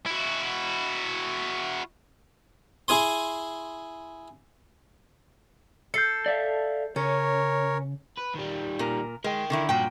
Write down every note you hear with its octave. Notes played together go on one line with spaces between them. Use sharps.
E4 F#4
E4 G#4 G#5 C6
A4 G6 C7 C#7
D5 E5 F5
C#3 C#4 A#4 C#5
B4
D#3 G3
A#2 A#4
G#3 A#4 G5
D3 D#3 E4
G2 A#2 F#4 G5